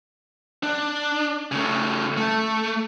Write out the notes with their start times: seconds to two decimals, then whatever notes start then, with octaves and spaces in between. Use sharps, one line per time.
0.63 D4
1.52 C#3 A3
2.17 A3